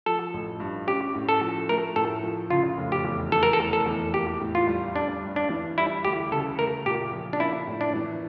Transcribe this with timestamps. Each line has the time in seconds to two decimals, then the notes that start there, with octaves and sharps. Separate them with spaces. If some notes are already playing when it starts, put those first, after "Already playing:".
0.06 F3 A4
0.34 A1
0.60 G2
0.87 C#4 G4
1.15 A2
1.29 A4
1.41 F3
1.69 A3 A#4
1.96 A2 A4
2.23 F3
2.50 C#3 F4
2.77 F1
2.92 G4
3.05 E2
3.32 E3 A4
3.43 A#4
3.53 A4
3.60 F1
3.73 A4
3.87 E2
4.14 A#3 G4
4.41 A2
4.55 F4
4.68 G3
4.96 G3 D4
5.23 G2
5.36 D4
5.50 E3
5.78 G3 E4
6.04 D2 G4
6.31 C#3 A4
6.59 A3 A#4
6.86 A#2 G4
7.13 F3
7.33 D4
7.40 A#3 E4
7.67 A2
7.81 D4
7.95 E3